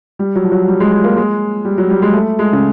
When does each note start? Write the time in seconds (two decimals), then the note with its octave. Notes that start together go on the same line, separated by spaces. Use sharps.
0.19 G3
0.35 F#3
0.44 F3
0.52 F#3
0.68 G3
0.80 G#3
0.92 G#3
1.04 A#3
1.17 G#3
1.65 G3
1.78 F#3
1.90 G3
2.02 G#3
2.14 A3
2.39 G#3
2.53 C#3